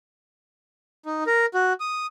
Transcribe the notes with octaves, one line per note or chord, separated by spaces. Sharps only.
D#4
A#4
F#4
D#6